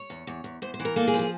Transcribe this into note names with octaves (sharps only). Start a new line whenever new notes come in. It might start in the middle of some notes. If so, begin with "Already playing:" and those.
Already playing: C#5
E2
E2
E2
E2 C5
C5
E3
A#4
A#3 A4
G#4
F3
G#4